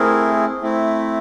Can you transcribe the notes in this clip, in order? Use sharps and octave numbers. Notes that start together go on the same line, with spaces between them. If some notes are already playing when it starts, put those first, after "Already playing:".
Already playing: A3 C4 E4 G#4 A#4
A3 C4 E4